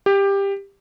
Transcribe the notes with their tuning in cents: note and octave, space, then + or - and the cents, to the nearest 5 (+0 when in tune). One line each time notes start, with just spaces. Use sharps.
G4 +15